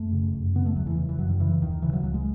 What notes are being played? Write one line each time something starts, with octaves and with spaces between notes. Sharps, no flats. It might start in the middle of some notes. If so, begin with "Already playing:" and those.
Already playing: F#2 A3
C#3
F#2
C#3 B3
A3
E2 F#3
E3
C#3
E3
F#2 F#3
D#3
C#3 E3
D#2 D#3
C#3 E3
F#3
C#2 F#3
G#3